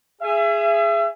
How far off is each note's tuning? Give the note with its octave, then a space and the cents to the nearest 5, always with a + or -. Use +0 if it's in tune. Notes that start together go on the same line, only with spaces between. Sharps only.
G#4 +0 E5 +35